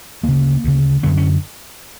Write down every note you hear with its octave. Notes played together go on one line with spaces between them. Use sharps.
D2 C#3 A#3
D2 C#3
F#2 D3 B3
C#4